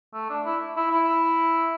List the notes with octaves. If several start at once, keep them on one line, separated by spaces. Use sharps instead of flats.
A3
D4
E4
E4
E4